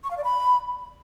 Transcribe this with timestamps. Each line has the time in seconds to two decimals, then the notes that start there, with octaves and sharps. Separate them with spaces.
0.04 C#6
0.11 F5
0.17 D5
0.24 B5